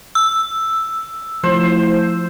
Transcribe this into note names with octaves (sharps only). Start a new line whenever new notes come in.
E6
F3 A3 E4 C5